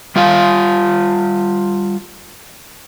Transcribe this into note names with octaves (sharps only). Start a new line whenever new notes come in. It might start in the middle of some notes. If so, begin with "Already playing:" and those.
G3 F4 F5